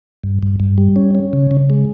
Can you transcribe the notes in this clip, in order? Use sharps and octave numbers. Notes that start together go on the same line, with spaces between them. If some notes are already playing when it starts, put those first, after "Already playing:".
G2
G2
G2
G3
C#4
C#4
C#3
C#3
G#3